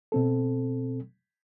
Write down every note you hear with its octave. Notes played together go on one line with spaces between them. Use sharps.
B2 C4 A4